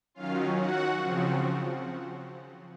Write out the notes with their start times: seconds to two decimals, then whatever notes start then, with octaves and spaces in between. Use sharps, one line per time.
0.14 D#3 F#3 C#4 F4 F5
0.55 F#4 F#5
0.96 C#3 F3 C4